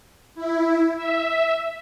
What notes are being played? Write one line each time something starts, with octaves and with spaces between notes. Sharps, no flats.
E4
E5